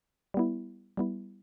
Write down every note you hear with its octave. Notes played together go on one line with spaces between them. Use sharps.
G3 B3 E4
G3 B3 E4